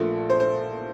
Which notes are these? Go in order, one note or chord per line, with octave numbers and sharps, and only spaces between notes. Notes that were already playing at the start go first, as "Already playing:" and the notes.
Already playing: A#1 A#2 F3 A3 A4
C5
C5